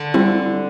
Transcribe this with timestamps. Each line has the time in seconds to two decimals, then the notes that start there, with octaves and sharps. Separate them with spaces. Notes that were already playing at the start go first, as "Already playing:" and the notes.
Already playing: D3
0.14 G3 C4 E4